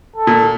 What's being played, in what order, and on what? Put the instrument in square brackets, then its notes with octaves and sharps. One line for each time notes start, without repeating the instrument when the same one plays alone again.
[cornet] A4
[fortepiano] A#2